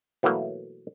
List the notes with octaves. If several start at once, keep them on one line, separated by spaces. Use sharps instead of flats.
B2 E3 F#3 A3 A#3